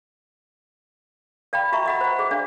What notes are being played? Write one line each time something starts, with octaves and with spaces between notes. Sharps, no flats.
D5 F5 G5 B5
F#4 E5 A#5 C#6
D#5 F#5 B5
C5 F#5
G#4
D4 D5 F5